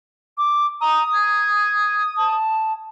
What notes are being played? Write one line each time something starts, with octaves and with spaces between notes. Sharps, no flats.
D6
A#5 D#6
G#6
A5